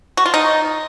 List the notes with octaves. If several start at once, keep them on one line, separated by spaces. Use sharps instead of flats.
F#4
F4
D#4